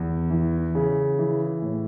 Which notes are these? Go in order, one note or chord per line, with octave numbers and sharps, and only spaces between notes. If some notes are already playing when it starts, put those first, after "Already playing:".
Already playing: E2
E3
C#3
E3
A2